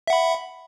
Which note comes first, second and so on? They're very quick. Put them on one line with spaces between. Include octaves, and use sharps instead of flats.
E5 F#5 B5